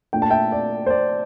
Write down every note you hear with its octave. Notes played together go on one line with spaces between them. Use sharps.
A#2 A3 D4 G5
A5
E5 G5
D5
C5
D5